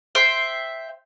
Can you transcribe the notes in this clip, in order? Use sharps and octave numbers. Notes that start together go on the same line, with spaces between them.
C5 E5 G5